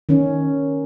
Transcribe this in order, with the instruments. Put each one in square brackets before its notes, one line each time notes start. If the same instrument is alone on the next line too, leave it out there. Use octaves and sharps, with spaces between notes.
[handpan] D#3 C#4